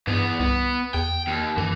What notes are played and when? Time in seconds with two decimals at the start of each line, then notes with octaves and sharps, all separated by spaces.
0.07 E2 G2 B3
0.40 C2 B3
0.94 E2 G5
1.27 D#2
1.57 F#2 E3